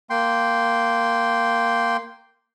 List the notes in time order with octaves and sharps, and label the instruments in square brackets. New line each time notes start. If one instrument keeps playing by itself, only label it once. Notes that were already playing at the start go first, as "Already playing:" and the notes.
[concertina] A#3 G5 C6